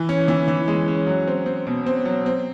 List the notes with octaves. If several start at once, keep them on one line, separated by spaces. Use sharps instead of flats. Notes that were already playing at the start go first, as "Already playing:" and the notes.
Already playing: E3
C#4
E3
E3
G#3
C#4
F#3
C4
C4
B2
C4
F#3
C4